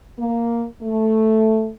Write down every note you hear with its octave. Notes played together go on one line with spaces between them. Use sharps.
A#3
A3